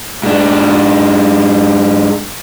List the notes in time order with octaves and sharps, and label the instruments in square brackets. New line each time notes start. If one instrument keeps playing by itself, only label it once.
[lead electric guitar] G#2 D4